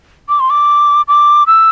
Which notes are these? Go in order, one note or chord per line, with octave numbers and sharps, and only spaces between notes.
D6
C6
D6
D6
E6